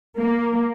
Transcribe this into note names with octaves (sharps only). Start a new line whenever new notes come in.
A#3